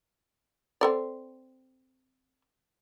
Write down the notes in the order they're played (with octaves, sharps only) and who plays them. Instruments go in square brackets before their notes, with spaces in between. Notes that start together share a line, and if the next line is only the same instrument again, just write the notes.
[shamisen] C4 A4 D5